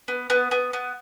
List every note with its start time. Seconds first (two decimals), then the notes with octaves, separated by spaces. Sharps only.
0.08 B3
0.30 B3
0.51 B3
0.73 B3